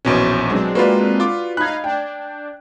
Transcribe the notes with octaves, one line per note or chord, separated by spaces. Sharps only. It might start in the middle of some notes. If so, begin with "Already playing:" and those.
A#1 E2 B2 C#4
F#3 G#3 C4 D4
A#3 F4 F#4 B4 D5
F4 D6
D#4 F5 B5 F#6 G#6
D4 G5